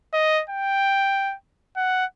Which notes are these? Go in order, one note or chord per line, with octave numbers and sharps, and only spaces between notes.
D#5
G5
F#5